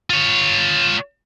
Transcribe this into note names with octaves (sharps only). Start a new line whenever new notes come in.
F4 C#5